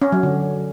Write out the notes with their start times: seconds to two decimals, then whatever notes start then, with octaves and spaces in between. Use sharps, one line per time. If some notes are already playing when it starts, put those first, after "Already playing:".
0.02 C#4
0.12 F#3
0.23 D3